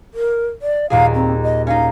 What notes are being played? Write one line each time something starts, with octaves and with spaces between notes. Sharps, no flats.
A#4
D5
D#2 A#2 G#4 F5
C4
D#5
C#4 D#4 F5